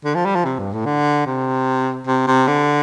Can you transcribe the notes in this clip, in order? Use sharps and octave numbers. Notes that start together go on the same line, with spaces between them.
D3
F3
G3
F3
C3
G2
A2
D3
C3
C3
C3
D3